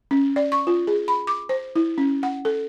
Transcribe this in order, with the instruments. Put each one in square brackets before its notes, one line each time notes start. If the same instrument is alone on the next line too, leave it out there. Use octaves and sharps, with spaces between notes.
[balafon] C#4
D5
C#6
F4
G#4
B5
D6
C5
E4
C#4
F#5
A4